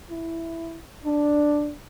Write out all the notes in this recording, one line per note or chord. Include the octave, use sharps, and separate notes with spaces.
E4
D4